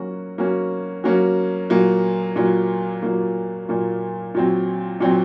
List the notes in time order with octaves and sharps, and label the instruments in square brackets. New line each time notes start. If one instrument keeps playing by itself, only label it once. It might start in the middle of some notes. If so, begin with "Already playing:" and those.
Already playing: [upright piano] F#3 A#3 C#4 F#4
F#3 A#3 C#4 F#4
F#3 A#3 C#4 F#4
A#2 F#3 A#3
A#2 F#3 A#3
A#2 F#3 A#3
A#2 F#3 A#3
A#2 F#3 C4
A#2 F#3 C4